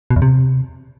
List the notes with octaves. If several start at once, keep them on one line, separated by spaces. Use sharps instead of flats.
B2
E2
C3